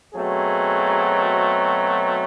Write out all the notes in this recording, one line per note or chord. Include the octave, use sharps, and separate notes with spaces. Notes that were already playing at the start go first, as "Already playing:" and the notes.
B2 F#3 A3 C4 G#4